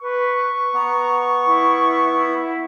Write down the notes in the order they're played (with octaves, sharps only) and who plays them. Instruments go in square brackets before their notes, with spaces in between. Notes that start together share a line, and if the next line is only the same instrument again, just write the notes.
[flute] B4 [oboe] C#6
[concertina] B3 [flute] A#5
[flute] E4
E4